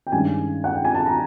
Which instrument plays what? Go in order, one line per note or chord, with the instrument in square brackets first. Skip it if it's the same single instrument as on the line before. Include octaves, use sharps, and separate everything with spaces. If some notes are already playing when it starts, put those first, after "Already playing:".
[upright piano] G5
G2 D#3 G#3 C#4 G#5
F#5
G5
G#5
A5
A#5